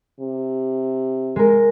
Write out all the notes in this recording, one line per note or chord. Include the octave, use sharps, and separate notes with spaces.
C3
G#3 A#4